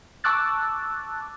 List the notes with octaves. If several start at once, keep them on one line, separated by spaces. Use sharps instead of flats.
A5 C#6 D6 E6 F#6 A6